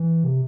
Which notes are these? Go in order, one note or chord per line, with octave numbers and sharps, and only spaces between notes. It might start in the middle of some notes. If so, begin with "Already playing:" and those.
Already playing: E3
C3